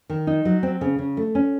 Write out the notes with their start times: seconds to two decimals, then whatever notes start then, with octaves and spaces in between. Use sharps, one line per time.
0.10 D#3
0.27 D#4
0.45 F#3
0.63 C4
0.81 C#3
0.99 C#3
1.17 A3
1.35 C#4